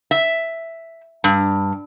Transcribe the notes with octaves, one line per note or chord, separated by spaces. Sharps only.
E5
G2